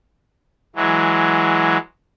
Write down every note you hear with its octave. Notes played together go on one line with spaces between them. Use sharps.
E3 F#3 G#3